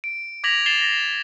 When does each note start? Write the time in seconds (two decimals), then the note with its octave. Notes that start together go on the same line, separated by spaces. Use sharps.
0.04 D7
0.44 D6 G#6 A#6 B6 F7 F#7
0.66 A6 C7 E7 G7
0.81 A#6